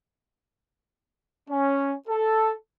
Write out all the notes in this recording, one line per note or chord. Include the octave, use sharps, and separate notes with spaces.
C#4
A4